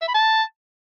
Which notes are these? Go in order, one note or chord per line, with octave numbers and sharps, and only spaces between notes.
E5
B5
A5